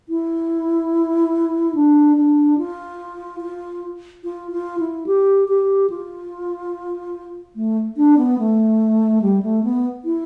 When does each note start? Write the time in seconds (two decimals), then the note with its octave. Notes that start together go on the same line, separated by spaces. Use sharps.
0.09 E4
1.75 D4
2.17 D4
2.58 F4
3.41 F4
4.24 F4
4.52 F4
4.80 E4
5.07 G4
5.48 G4
5.90 F4
7.56 A3
7.97 D4
8.18 B3
8.39 A3
9.22 G3
9.43 A3
9.64 B3
10.05 E4